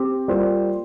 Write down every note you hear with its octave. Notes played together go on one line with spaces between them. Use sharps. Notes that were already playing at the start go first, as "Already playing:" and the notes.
Already playing: C4 G4
G3 A#3 F4 C5